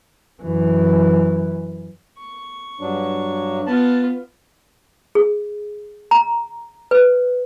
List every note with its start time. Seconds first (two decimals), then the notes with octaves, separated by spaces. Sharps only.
0.43 F#2 E3
2.17 C#6
2.80 G2 F#3 D4
3.67 B3 F4 A5
5.15 G#4
6.11 A#5
6.91 B4